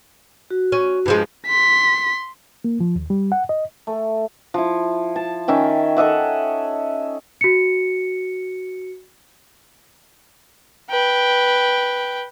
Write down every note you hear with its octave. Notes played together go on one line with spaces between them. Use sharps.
F#4
C#4
G2 F3 G#3
C6 B6
A#3
F3
D#2
G3
F#5
D#5
A3
F3 E4
A5
D#3 C#4 E5 G5
A4 D#5 E5 F#5
F#4 C#7
B4 G5